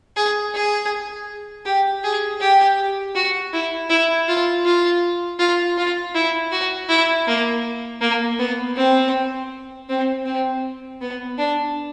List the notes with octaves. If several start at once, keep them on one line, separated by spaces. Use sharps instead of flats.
G#4
G#4
G4
G#4
G4
F#4
E4
E4
F4
F4
F4
F4
E4
F#4
E4
A#3
A#3
B3
C4
C4
C4
B3
D4